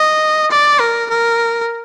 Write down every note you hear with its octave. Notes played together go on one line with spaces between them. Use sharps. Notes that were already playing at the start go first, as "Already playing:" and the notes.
Already playing: D#5
D5
A#4
A#4